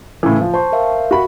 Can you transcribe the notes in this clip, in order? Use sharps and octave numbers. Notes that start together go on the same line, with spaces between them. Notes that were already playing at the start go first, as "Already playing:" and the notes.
A2 C#3 E3
F3
C5 A5 C#6
A#4 E5 F5
F#4 B5